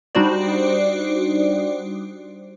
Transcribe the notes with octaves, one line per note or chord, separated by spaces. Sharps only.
G3 D4 D#4 F#4 C5 D5